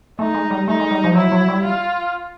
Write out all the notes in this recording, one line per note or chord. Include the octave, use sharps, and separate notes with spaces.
A3 D#4
G#3
G3
A3 D#4
G#3
G3
F3
F#3 E4
F#3
G3
F4